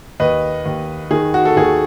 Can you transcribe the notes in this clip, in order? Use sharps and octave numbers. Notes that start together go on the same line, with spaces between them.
D#2 B4 D#5
D#2
D#3 G#4
F#4
A4
D#2 G#4